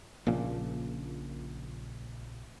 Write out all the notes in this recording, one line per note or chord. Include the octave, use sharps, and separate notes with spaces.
A#1 A#2 C#3 F3